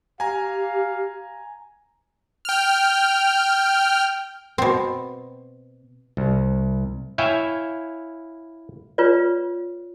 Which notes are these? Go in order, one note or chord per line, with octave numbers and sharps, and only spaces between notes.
G4 F5 G#5 A#5
G5 F6
B2 C4
C2
E4 C#5 E5 F5 G5 G#5
F4 B4 C#5 D5